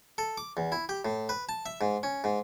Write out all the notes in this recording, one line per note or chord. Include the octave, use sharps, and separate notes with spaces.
A4
D6
E2
E4
G4
A2
B4
A5
E5
G#2
C#4
G#2